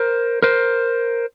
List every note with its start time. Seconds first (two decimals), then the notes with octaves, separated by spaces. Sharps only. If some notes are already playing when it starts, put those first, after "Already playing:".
Already playing: A#4 C5
0.42 A#4 C5